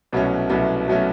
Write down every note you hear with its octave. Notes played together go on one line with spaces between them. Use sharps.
C2 B2 F#3 A3 C#4
C2 B2 F#3 A3 C#4
B2 F#3 A3 C#4